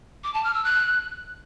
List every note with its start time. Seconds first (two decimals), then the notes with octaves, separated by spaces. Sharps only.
0.24 D6
0.34 A5
0.44 F6
0.54 E6
0.65 F#6